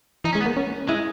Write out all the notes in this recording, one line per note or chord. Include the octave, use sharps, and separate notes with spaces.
E3 D#4
C#4
G#3
B3
A#3
C#4
G#3 E4